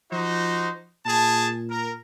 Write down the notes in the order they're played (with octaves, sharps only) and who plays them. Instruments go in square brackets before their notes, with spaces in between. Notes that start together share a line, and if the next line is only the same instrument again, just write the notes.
[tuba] F3 [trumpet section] D#4 F#4 C5
[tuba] A#2 [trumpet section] G#4 A5
[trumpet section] A#4